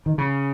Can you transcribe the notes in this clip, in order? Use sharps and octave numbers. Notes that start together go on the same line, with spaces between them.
D#3
C#3